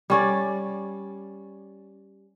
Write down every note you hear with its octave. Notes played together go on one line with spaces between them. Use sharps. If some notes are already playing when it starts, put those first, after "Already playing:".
G3 C#4 D5